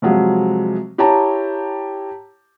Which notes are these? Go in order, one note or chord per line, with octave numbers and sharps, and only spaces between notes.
C3 F3 F#3 G#3
E4 G4 C#5 G5 A5 A#5